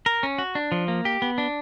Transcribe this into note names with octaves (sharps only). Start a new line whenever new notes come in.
A#4
C#4
F#4
D4
F3
A#3
G4
B3
D4